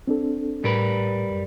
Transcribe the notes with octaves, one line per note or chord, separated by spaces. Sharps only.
C4 D4 A4
A2 G3 A#4 B4
F#2